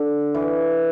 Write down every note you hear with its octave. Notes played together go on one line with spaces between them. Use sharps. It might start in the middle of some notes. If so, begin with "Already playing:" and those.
Already playing: D3
E3